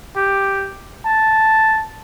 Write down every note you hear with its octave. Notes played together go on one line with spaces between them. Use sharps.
G4
A5